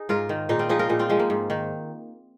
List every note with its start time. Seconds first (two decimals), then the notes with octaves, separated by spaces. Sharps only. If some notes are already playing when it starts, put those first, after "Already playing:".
Already playing: D#4 G#4
0.09 G#2 F4 A#4
0.29 D#3
0.49 A#2 D#4 G#4
0.59 C4 F4
0.69 F3 D#4 G#4
0.79 F4 A#4
0.89 A#2 D#4 G#4
0.99 C4 F4
1.09 F3 G#3
1.19 A#3
1.30 G#2
1.50 D#3